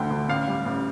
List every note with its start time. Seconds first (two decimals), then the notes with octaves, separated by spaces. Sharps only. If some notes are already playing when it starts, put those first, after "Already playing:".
Already playing: D2 D3 G5
0.10 D2
0.28 A1 F5
0.47 G3
0.66 A1